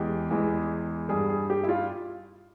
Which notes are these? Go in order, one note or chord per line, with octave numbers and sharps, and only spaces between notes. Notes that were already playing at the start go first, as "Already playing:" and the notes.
Already playing: E2 E3 G#3 G4
E2 E3 G#3
G2 G3 G#4
G#4
G4
E4
F4